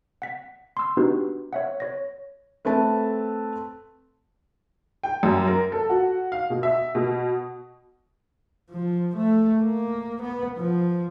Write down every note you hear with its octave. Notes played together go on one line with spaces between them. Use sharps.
F#5 B6
C6 E6
B3 D4 D#4 F#4 G4 B4
C#5 E5 F#5
C#5 A#6
A3 C4 B4 A5
G5
F#2
A#4
A4
F#4
F5
B2
E5
B2
F3
A3
A#3
B3
F3